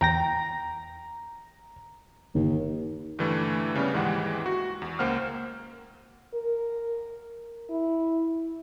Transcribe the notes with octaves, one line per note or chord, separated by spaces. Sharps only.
E2 G5 A#5 A#6
G1 D#2
G2 D3 E3 G3 A3
C#3 G3 B3
D#2 G#2 E3 G#3 G4 F#5
F#4
E2
C#2 A#3 C5 F#5 F6
A#4
E4